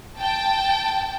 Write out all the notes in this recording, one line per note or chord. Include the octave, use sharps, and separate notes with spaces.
G5 A5